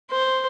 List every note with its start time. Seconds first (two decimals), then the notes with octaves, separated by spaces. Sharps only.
0.11 C5